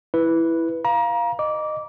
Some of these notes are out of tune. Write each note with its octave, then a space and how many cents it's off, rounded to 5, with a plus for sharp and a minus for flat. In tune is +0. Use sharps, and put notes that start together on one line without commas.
E4 +0 B4 +0
F5 +0 A#5 +30
D#5 -20 D6 -15